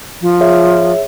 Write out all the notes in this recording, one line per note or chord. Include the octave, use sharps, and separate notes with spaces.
F3
G#4 C#5 E5